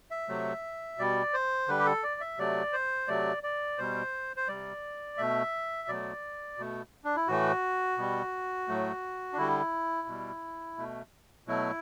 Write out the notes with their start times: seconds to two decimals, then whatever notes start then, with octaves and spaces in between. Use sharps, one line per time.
0.11 E5
0.29 C3 F#3 A3
0.98 B2 G3 D5
1.34 C5
1.68 D3 G3 B4
1.79 G4
1.85 A4
2.03 D5
2.21 E5
2.38 C3 F#3 A3 D5
2.73 C5
3.08 C3 F#3 A3 D5
3.43 D5
3.78 B2 G3 C5
4.37 C5
4.48 C3 G3 D5
5.18 B2 A3 E5
5.88 B2 F#3 A3 D5
6.58 B2 A3
7.04 D4
7.16 E4
7.28 A2 E3 A3 F#4
7.98 B2 G3
8.68 A2 F#3 A3
9.33 D4
9.37 D3 G3 E4
10.07 B2 G3
10.77 B2 A3
11.47 B2 F#3 A3 E4